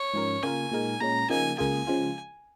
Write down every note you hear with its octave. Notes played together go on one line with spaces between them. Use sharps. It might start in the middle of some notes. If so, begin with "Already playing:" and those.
Already playing: C#5
G#2 F3 C#4 A#4
C#3 A#3 F4 A#4 G#5
A#2 G#3 D#4 A#4
A#2 G#3 C#4 A#5
C#3 F3 A#3 D#4 G#5
C#2 C#3 A#3 F4 G#4 G#5
C#3 F3 G#3 F4